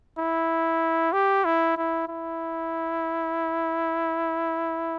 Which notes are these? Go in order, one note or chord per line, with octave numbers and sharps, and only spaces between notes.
E4
G4
E4
E4
E4